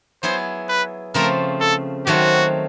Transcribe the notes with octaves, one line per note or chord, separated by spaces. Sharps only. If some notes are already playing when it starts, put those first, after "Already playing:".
F#3 B3 E4 G#4 C5
B4
C#3 F3 A3 C4 A#4
A4
D#3 F#3 A3 C4 F#4